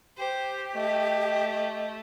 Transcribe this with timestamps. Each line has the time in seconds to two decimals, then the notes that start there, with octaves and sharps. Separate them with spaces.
0.17 G4 C5
0.75 A3 D#5